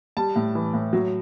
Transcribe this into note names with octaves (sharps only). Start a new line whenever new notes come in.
G3 A5
A2
E3
A2
F#3